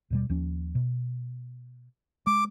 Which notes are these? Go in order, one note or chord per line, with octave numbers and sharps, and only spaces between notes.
D#2 B2 G3
D#2 F3 C#4
B2
G#3 D6